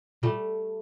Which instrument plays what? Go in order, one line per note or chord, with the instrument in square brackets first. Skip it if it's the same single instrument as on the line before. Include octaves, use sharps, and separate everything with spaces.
[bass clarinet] A#2 [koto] G3 A3